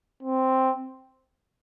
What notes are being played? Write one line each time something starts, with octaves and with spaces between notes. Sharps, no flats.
C4